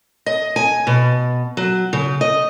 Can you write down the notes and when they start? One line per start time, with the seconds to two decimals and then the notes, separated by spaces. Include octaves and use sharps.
0.26 D#5
0.56 G#5
0.87 B2
1.57 F#3
1.93 C#3
2.21 D#5